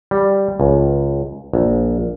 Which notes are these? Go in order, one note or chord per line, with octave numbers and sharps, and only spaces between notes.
G3
C#2
A#1